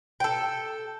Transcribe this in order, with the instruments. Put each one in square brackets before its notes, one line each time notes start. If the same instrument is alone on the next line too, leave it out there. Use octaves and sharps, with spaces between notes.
[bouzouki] A4 G5